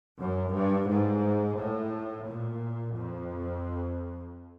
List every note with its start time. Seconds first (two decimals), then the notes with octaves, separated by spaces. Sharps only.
0.20 F#2
0.54 G2
0.89 G#2
1.57 A2
2.26 A#2
2.96 F2